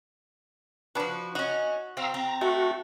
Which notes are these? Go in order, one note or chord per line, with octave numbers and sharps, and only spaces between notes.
F3 D4 F#4 B4
C#4 D#4 F#4
C4 F5 A#5 E6
C4 A#5
A3 F#4